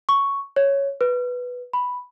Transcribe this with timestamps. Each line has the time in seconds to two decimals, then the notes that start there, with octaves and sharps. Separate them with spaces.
0.09 C#6
0.56 C#5
1.01 B4
1.73 B5